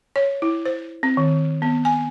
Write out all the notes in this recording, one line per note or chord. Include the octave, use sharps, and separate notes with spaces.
C#5
E4
C5
C4
D#3
B3
G#5